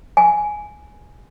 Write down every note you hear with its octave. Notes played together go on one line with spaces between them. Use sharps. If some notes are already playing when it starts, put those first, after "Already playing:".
G#5